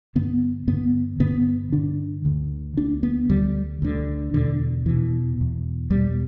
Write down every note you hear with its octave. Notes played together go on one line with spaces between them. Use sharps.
G2 D3 B3
G2 D3 B3
G2 D3 B3
G2 D3 D4
D2 D3
D2 D3 D4
B3
D2 D3 G3
D2 D3
E2 B2 D3
E2 B2 E3
E2 B2
E2 B2 G3